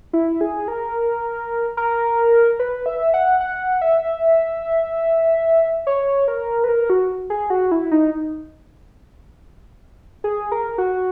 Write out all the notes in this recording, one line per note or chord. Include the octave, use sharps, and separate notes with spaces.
E4
G#4
A#4
A#4
B4
E5
F#5
F#5
E5
C#5
A#4
B4
A#4
F#4
G#4
F#4
E4
D#4
G#4
A#4
F#4